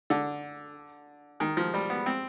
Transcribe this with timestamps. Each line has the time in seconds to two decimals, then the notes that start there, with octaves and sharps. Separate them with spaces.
0.10 D3
1.40 D#3
1.57 F3
1.74 G3
1.90 B3
2.06 C4